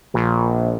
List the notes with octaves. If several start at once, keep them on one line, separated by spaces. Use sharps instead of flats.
A#1